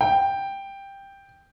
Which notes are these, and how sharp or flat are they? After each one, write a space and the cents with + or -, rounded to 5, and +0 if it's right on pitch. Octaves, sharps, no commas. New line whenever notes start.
G5 +5